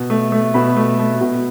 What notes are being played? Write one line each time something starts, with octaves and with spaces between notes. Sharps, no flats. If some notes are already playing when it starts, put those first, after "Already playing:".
Already playing: B2
A3
A3
B2 B5
A3
A3
B2